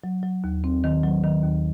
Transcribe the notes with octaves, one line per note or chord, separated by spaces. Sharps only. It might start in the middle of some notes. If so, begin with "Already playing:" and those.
F#3
F#3
D#2
C4
D#3
F#3
D#3
D#2